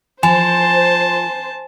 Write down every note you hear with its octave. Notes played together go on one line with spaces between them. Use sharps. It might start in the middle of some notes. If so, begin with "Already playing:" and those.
F3 C5 G#5 A5